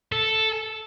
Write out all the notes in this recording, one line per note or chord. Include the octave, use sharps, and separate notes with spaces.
A4